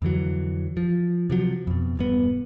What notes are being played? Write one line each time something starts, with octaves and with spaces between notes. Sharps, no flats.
F2 D3 E3 F#3
F3
C3 F3 F#3
F2 B2
E1 G2 B3